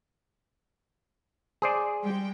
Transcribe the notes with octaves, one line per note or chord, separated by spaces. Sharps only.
G#4 C5 D5
G3 G#3 G5